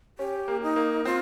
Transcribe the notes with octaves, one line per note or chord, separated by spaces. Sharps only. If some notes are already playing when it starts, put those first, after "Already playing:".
C#4 G4
A#3
D#4
A#3
C4 F4